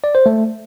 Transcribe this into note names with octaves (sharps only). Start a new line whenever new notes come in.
D5
C5
A3